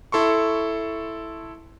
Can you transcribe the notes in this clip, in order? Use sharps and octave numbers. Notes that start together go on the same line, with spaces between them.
E4 A4 C6 C#6